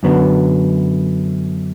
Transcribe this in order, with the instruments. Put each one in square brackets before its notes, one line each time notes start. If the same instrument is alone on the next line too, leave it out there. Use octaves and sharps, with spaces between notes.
[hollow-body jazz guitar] F#2 D3 F#3 B3